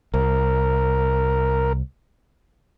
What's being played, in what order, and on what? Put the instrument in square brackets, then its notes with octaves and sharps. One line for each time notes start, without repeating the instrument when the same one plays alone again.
[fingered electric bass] C2 [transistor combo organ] A#4